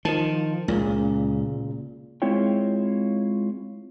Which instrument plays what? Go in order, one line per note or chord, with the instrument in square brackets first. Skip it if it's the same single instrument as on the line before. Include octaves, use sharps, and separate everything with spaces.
[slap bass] D#3 [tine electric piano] F3 A5
[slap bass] C#2 [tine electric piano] A#2 C#3
[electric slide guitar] G#3 C4 E4 F4 C#5 G5